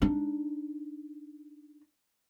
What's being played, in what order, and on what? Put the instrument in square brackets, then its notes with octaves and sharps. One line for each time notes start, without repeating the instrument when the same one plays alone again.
[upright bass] D4 D#4